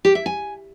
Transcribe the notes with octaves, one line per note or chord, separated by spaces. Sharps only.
G4
E5
G#5